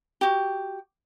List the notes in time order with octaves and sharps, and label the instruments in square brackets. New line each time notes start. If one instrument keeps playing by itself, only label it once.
[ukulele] F#4 G4